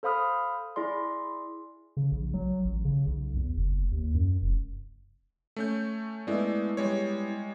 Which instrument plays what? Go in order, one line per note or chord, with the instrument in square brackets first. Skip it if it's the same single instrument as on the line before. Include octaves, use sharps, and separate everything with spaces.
[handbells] A4 C5 F5 B5 D#6 F6
E4 G#4 D5 C6
[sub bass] C#3
A#1
F#3
A1
C#3
B1
E2
F#1
D#2
F#2
F1
[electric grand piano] A3 C#4 G6
[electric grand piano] G#3 A3 [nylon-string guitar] B3 E4 D5
[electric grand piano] G3 G#3 C#5